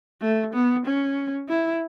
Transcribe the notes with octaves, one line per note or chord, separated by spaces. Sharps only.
A3
B3
C#4
E4